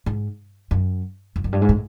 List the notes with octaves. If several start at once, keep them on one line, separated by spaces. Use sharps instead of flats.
G#2
F#2
F2
F#2
G2
G#2
A2